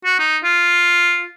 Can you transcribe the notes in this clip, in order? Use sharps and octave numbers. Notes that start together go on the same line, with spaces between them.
F#4
D#4
F4